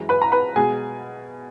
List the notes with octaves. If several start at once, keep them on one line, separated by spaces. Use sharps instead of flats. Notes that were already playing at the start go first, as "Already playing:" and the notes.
Already playing: F#2 E3 G#3
B4 B5
A#5
B4 B5
B2 G#3 G#4 G#5